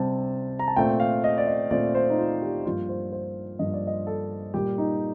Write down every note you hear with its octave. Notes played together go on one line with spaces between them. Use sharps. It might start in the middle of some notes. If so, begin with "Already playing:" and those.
Already playing: C3 G3 C4 A5
A#5
A5
A#2 A3 C4 G5
F5
D#5
D5
D#5
A#2 A3 C4 D5
C5
D#4
F4
G4
G2 F3 A#3 F4
C5
C5
G2 F3 A#3 D#5
D5
D#5
A4
A#2 G3 A#3 G4
D#4